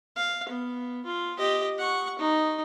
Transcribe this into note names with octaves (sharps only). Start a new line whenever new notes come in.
F5
B3
F4
G4 D#5
F#5 C#6
D#4